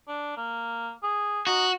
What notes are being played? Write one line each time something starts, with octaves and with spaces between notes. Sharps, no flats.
D4
A#3
G#4
D#4 F#4